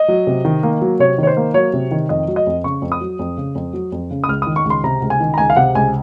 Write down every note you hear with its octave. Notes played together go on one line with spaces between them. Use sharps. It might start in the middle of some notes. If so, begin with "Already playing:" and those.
Already playing: D#5
F#3
C3
D#3
A#3
F#3
C3 C#5
D#3
C#5
C5
A#3
F#3 C#5
C3
D#3
F2 D#5
F#3
D#5
F2
C#3 C#6
F2
D#6
F#3
F2
C#3
F2
F#3
F2
C#3
D#6
C#2 F6
D#3 D#6
C#6
C#2
C6
C3 A#5
C#2
G#5
D#3
A#5
C#2 G#5
F5
C3 F#5
C#2 G#5